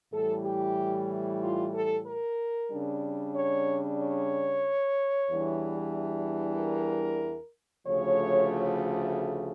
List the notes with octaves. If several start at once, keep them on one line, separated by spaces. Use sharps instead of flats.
A2 E3 G3 A4
G4
F4
A4
A#4
C#3 G3 D4
C#5
C#5
E2 E3 G3 D4
A#4
D2 C#3 F3 A3 C#5